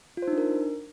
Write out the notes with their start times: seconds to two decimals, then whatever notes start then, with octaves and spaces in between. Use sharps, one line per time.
0.17 F4
0.22 C5
0.27 D#4
0.33 D4
0.38 A#4